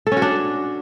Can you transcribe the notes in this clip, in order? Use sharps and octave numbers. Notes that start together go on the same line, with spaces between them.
A4
C#4
F#4
D4